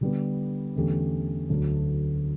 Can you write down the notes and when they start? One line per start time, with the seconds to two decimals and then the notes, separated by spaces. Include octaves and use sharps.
0.01 D3 G3 B3
0.76 E2 D3 A3 C#4 G4
1.49 D2 D3 F#3 A3 D4